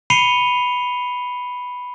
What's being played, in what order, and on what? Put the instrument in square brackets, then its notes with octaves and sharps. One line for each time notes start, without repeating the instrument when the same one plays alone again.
[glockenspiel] B5 C7 C#7 D#7 F7 G7